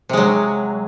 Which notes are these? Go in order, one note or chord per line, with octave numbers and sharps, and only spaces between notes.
C3 F#3 G#3